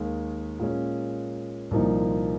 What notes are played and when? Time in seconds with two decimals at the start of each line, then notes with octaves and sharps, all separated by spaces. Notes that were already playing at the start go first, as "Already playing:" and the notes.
Already playing: D#2 D#3 G#3
0.59 A#2 G#3 C#4
1.71 C2 A#2 F3 A#3 D#4